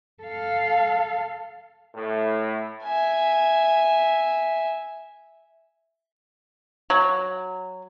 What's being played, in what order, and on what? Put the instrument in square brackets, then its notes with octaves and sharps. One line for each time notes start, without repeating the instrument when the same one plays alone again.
[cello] A4 F5
[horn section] A2
[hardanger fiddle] E5 G#5
[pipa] F#3